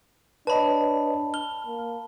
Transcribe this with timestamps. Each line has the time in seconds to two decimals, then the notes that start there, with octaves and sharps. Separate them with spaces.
0.47 D4 B4 C#5 D#5 A5 B5
1.34 F6 G7
1.67 A#3